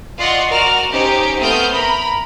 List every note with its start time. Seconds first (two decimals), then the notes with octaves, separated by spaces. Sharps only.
0.18 F4 D5 D#5 F#5 C6 C#6
0.50 F#4 A#4 D5 F6
0.91 C#4 D#4 G4 C5
1.39 A3 B3 C4 D#6 F6 G6
1.72 A#4 A#5 B5